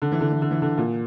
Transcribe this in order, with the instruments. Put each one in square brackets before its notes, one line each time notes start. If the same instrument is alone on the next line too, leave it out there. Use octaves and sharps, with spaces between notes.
[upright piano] D3
E3
D3
E3
D3
E3
D3
A#2